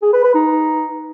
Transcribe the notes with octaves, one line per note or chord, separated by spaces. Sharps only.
G#4
B4
B4
D#4